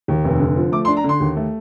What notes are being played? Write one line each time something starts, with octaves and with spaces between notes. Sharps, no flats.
D#2
F1
D3
F3
A3 D6
C6
D4
A#5
D3 C6
D#2
A3